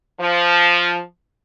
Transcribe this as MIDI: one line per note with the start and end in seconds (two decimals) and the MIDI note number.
0.20 0.99 53